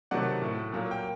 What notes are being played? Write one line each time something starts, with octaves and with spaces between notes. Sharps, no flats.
C3 D#3 F#3 A3 D5 F#5
A2 A3
A#2 F#3 A#3
G5